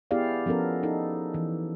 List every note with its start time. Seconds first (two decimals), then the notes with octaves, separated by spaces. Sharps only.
0.11 B3 E4 G4 G#4 D5 F5
0.46 F3 B3 C#4 A4 A#4
0.83 D#4 A4
1.34 E3